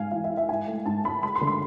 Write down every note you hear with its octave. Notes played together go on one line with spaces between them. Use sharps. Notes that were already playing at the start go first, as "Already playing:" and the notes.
Already playing: G#2 F5 G#5
E3 F5
E5
E4
E5
G#2 G#5
A3
G#2 A5
G#2 B5
G#3 B5
C6
D3
C6